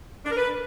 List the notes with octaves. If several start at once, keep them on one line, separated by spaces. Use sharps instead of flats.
D4
A#4
B4